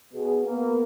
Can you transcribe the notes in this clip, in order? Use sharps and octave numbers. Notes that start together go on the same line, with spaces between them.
B1 B2 G#4
A#3 B3